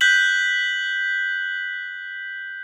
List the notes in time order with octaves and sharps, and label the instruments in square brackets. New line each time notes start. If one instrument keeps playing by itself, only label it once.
[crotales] F#6 G6 B6 F#7